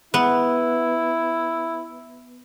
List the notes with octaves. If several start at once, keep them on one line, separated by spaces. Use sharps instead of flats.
B3 E4